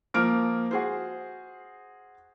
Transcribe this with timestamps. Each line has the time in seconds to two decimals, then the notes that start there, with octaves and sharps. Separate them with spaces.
0.14 F3 A#3 F6 D7
0.71 F#4 G#4 C5